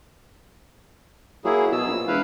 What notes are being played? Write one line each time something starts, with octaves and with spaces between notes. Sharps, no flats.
F#3 A#3 E4 G#4
B2 E6
A#1
E1 E4 B4 F5